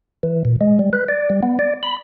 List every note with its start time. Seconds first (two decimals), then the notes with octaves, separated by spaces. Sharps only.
0.23 E3
0.45 A#2
0.61 G#3
0.79 G3
0.93 B4
1.08 D5
1.30 G3
1.43 B3
1.59 D5
1.83 B5